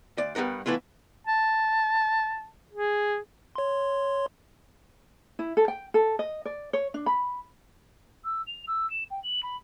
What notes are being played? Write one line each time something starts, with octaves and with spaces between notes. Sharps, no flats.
D2 D5
G2 G3 B3 A#4 F#5
E3 A3 B3 E4 F4
A5
G#4
C#5 C6
E4
A4
G5
A4
D#5
D5
C#5
D4
B5
E6
F7
E6
E7
G5
F#7
B5